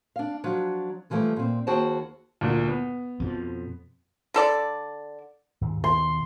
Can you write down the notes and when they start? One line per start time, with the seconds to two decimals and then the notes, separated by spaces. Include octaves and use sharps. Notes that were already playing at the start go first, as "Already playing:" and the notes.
0.16 D4 F5
0.44 F3 F#3 D4
1.10 D3 E3 F3 G3 A3
1.36 A#2 C4
1.67 D#2 F#4 G#4 C5 G5 A5
2.41 D2 A#2
2.68 B3
3.20 F2 B2 F3
4.34 D3 A4 D5
5.61 D#2 G#2 G#3
5.84 D#2 B2 C6